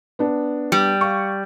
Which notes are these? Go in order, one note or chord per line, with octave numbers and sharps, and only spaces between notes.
B3 D4
G3
F5 C#6